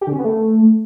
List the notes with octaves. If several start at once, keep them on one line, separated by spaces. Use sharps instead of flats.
G4
D3
C#4
B3
A3